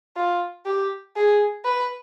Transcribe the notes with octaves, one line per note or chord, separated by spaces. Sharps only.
F4
G4
G#4
B4